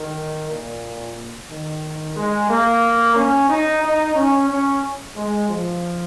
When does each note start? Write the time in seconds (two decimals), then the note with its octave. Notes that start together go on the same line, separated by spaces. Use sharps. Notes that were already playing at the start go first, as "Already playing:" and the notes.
Already playing: D#3
0.50 A#2
1.49 D#3
2.16 G#3
2.50 A#3
3.16 C#4
3.49 D#4
3.83 D#4
4.15 C#4
4.49 C#4
5.17 G#3
5.49 F3